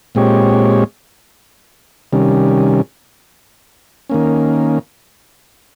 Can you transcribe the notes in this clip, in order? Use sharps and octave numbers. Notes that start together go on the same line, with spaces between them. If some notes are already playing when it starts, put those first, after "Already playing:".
A#2 G#3 C4 G4 C#5
C3 D#3 G3 C#4
D#3 A#3 C#4